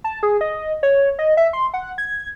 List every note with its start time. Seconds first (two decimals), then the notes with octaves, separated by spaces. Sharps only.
0.04 A5
0.23 G#4
0.41 D#5
0.83 C#5
1.19 D#5
1.37 E5
1.53 C6
1.74 F#5
1.98 G#6